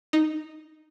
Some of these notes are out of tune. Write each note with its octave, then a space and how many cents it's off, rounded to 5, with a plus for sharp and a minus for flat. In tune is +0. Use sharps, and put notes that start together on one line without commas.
D#4 -5